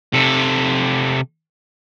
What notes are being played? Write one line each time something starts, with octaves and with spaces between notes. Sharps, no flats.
C3 A4